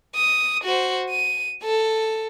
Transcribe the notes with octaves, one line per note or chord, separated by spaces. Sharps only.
D#6
F#4 C5
D#7
A4